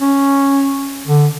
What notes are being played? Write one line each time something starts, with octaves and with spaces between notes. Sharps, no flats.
C#4
D3